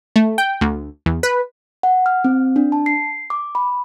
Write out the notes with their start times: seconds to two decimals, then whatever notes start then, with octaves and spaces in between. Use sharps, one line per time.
0.16 A3
0.38 G5
0.61 D2
1.06 E2
1.23 B4
1.83 F#5
2.06 F6
2.25 C4
2.56 D4
2.72 A5
2.86 C7
3.30 D6
3.55 B5